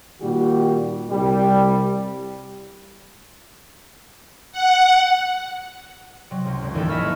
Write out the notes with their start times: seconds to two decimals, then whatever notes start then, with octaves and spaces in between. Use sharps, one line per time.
0.21 A#2 D#3 G3 F#4 G4
1.10 C2 G3
4.52 F#5
6.31 C3 F#3
6.45 C#2
6.62 F1 G#3
6.74 G#1 D#2 E3 D#4 G4 A4
6.89 G#4 D#5 E5 B5 C#6 F6
7.02 A#3 B4 A5